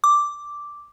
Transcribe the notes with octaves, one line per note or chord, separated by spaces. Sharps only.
D6